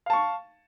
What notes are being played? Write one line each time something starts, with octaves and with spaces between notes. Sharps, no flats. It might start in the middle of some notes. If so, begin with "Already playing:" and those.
F5 A5 C#6